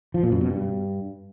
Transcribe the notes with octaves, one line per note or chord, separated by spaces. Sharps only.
F3
A#2
F#2
B2
G2